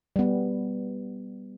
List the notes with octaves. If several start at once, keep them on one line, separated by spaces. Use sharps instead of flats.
G3 B3